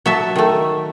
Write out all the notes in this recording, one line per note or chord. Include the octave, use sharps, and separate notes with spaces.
F#3 E5 A5
D#3 A3